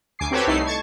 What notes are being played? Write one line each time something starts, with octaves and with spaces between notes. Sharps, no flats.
D2 G#5 D6 C7
C4 F#4 G4 A4 B4 C#5
C2 A3 D#4 E4 A4 C7
A5 C#6 G#6